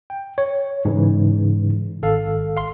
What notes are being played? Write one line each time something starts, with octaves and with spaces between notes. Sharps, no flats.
G5
C#5
G#2 C#3 E3
G#1 A4 F5
F5 C6